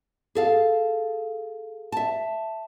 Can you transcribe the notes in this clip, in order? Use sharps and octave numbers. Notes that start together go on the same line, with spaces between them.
G#4 A4 F5
E5 A5